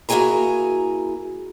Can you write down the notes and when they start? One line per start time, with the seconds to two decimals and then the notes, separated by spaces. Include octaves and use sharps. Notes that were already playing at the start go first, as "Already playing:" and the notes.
0.09 A#3 E4 F#4 G#4 G#5 A#5